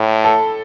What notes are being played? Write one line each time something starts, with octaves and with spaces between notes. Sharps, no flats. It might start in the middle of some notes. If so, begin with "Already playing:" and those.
Already playing: A2
A4